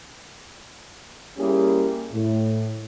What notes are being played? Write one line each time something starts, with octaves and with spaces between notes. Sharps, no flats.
G3 A#3 C#4 E4 G4 G#4
A2